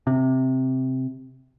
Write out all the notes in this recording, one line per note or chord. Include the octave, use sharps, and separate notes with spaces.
C3